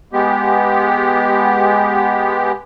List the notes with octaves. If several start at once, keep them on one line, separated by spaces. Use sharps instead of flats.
G#3 B3 G4